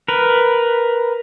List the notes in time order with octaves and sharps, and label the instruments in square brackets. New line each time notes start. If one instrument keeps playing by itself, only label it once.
[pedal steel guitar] A#4 B4